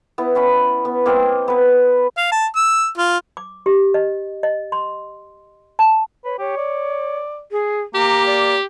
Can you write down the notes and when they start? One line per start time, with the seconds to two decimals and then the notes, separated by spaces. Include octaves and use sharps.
0.18 B3 E4
0.35 B3 C#4 B5
0.85 B3
1.06 A#3 C4 D#5
1.48 B3 B4
2.17 F5
2.32 A5
2.56 E6
2.98 F4
3.37 D6
3.66 G4
3.94 D#5
4.43 D#5
4.72 C6
5.79 A5
6.25 B4 C#5
6.39 G4 C#5
6.57 D5
7.51 G#4
7.94 A#3 G4 A#5
8.26 D5